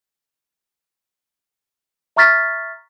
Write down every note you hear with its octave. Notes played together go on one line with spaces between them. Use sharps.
E5 A#5 C#6 F6 A6 B6